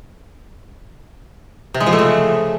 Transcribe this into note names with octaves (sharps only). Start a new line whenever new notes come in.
C3
G#3
F3
A3
C#3